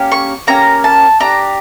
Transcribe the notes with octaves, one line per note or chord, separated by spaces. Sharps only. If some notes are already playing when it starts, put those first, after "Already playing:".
Already playing: A#3 C#4 G4
C#6
A#3 C#4 G4 A#5
A5
D4 G4 A#5